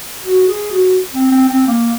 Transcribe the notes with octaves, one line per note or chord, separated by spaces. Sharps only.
F#4
G#4
F#4
C4
C4
C4
A#3